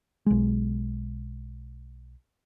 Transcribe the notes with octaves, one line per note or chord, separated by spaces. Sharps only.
B1 G#3